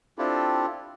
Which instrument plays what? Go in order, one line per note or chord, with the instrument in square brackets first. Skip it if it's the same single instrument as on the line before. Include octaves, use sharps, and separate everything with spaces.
[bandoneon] C4 D4 E4 F4 G4 A4